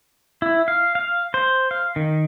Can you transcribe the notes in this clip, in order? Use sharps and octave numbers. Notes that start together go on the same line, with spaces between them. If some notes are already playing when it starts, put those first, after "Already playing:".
E4
F5
F5
C5
F5
D#3